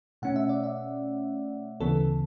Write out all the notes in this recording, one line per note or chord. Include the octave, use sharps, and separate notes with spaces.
B2 A3 C#4 F#5
E5
D5
E5
D2 C#3 E3 B3 A4